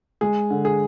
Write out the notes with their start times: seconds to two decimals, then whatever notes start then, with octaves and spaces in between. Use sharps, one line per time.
0.21 G#3 G#4
0.50 D3
0.65 G#4